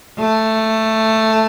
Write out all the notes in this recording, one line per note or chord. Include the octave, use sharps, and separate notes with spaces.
A3